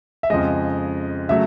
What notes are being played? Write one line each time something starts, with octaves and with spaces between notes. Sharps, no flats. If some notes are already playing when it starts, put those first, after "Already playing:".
E5
F2 C#3 F3 G#3 D#5
C#3 F#3 A3 E5